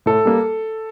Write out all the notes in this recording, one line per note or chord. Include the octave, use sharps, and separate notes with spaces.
A2 A4
G3 A#3